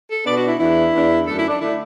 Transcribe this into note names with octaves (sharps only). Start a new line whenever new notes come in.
A4
B2 B3 D4 D5
F#4
E4
E2 E3 D4 E4
E2 E3 D4
F#2 D3 A3 D4 A4
E4
D4
D3 A3 D4 E4